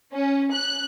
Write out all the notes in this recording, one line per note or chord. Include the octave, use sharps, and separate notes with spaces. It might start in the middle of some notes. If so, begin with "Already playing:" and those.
C#4
F#6